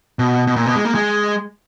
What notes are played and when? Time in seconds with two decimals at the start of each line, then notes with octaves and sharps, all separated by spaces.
0.19 B2
0.47 B2
0.56 A#2
0.66 B2
0.76 G#3
0.85 A#3
0.95 G#3